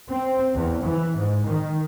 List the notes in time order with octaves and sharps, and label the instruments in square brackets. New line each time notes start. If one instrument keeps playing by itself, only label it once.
[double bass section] C4
E2
E3
G#2
D#3